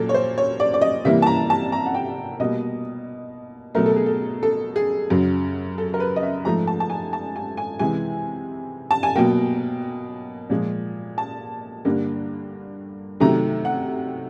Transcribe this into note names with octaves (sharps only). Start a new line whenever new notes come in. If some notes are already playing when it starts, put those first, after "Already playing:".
Already playing: A#2 F#3 A#3 A4
C#5
C5
C#5
D5
D5
D#5
C3 E3 G3 A#3 E5
A5
A#5
A5
A#5
F#5
G5
B2 G3 A#3 D#5
B2 F#3 A3 A#4
A4
G#4
A4
A4
G#4
F#2 C#3 F#3
A4
A#4
B4
D#5
E5
G#2 F3 A3 A#5
A5
A5
G#5
A5
G#5
G#5
C3 E3 G#3 G#5
A5
G#5
B2 F#3 A#3 G5
A#2 F3 G#3
A5
G2 D3 G3 A#3
C3 D#3 F#3 A3 A#5
F#5